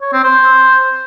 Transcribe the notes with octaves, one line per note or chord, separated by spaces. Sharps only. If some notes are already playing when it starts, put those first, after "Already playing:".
C#5
C4
C5